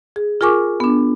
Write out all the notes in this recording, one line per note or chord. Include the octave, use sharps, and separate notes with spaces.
G#4
F4 G#4 A#4 G#5 C#6 D6
B3 D4